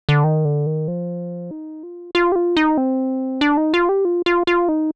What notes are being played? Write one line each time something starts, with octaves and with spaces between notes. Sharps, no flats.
D3
D#3
D3
D#3
F3
D#4
F4
F4
G4
F4
D#4
C4
D4
D#4
F4
G4
F4
F4
F4
D#4